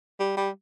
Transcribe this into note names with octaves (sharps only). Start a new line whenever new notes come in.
G3
G3